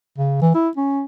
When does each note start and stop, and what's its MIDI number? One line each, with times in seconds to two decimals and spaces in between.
0.18 0.37 49
0.42 0.51 52
0.55 0.69 64
0.77 1.05 61